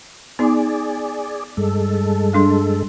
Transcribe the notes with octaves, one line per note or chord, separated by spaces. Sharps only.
B3 D#4 G#4 D5
G2 G#3 A4
G3 D4 C6